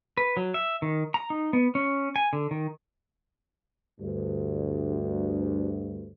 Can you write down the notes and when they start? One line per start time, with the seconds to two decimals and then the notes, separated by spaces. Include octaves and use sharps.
0.17 B4
0.37 F#3
0.54 E5
0.82 D#3
1.14 A#5
1.30 D#4
1.53 B3
1.75 C#4
2.16 G#5
2.33 D3
2.51 D#3
4.00 D2 G2